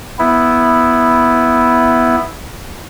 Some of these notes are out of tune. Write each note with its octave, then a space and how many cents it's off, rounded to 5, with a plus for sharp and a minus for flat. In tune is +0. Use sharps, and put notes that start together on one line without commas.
B3 +0 E4 +0